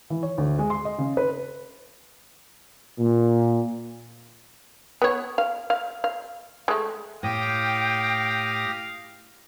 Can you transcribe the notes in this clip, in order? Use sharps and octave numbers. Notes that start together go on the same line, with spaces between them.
E3
C#5
D2
G#3
C6
D#5
C#3
B4
A#2
B3 C#5
F5
F5
F5
G#3 A3
A2 G4 F5 G5 D#6 A#6